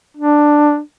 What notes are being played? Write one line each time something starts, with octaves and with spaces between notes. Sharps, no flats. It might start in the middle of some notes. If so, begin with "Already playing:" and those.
D4